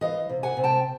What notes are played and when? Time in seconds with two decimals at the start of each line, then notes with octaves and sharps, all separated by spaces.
0.01 E3 D#5 F5
0.29 C3
0.43 F#5 G#5
0.57 C3
0.64 G5 A5